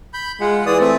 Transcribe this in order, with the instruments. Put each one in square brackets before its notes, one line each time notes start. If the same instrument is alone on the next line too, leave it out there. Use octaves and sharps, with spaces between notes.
[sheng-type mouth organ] B5 G6
[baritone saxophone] G#3 [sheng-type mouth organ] F4 F#5
[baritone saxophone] E3 [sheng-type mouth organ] G#4 D5 D#6
[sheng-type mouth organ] A3 C4